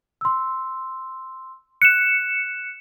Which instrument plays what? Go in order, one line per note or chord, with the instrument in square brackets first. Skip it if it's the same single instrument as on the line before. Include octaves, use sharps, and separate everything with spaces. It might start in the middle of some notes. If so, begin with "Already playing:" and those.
[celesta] C6 E6
[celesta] F#6 [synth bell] C#7 E7